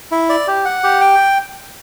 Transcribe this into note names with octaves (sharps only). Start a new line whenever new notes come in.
E4
D5
G4
F#5
G4
G5